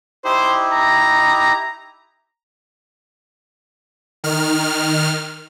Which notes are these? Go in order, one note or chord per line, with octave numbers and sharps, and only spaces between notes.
D#4 E4 G4 C5
A#5
D#3 F6